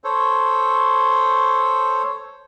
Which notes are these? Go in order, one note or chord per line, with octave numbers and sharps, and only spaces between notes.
A4 C5 C#5